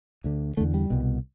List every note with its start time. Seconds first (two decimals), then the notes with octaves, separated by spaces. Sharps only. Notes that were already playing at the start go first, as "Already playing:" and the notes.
0.24 D2 D3
0.57 E2 D3 A3
0.74 G3
0.90 C2 B2